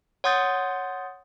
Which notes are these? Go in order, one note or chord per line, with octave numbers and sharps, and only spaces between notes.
C#5 F#5 C6 D#6 G6 A6